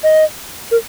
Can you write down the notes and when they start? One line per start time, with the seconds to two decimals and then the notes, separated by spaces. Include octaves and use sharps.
0.04 D#5
0.71 A#4